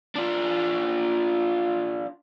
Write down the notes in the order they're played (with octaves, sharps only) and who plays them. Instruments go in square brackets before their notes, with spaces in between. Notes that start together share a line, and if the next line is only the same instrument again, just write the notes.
[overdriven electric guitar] D4 F4